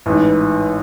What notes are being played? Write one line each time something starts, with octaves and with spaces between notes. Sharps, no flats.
A1 G#2 E3